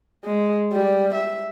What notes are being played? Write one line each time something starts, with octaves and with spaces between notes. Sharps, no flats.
G#3
G3
E5